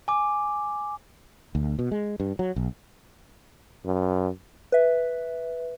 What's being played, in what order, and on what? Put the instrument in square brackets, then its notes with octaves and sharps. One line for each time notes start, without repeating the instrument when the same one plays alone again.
[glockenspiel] G#5 D6
[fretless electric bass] D2
B2
G#3
G2
F#3
B1
[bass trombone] F#2
[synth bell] B4 E5